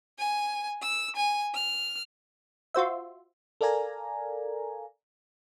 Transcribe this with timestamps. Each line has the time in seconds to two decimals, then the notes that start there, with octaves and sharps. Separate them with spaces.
0.19 G#5
0.82 E6
1.16 G#5
1.54 F6
2.74 F4 F#4 C5 E5
3.61 A4 A#4 D5 F5 G#5 A#5